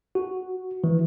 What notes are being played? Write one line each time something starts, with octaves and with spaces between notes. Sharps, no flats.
F#4
E3